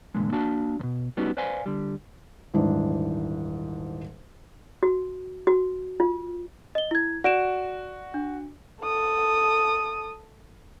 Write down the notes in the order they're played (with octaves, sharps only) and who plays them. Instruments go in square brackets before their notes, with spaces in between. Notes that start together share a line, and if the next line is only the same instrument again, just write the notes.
[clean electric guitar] E2 G2 A#2 D3 G#3
A#3 D4 F#4 F5 A5
E2 B2
G3 B3 C#4 D#4 F#4
B4 C5 D5 F5 G#5
D3 G3
[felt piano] D#1 G#2 E3 D4
[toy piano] F#4
F#4
F4
[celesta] D#5 G7
E4 G#6
[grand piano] F#4 [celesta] D5 D7 E7
[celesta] D4
[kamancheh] A4 D#6